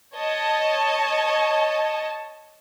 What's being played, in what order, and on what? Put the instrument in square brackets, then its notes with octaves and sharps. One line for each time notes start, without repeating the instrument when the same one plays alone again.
[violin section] C#5 D#5 A5